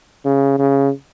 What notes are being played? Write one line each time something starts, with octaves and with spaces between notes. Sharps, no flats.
C#3
C#3